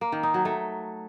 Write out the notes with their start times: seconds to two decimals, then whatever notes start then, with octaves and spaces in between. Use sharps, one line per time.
0.01 A#3
0.12 D#3
0.23 D#4
0.34 F#3
0.45 A3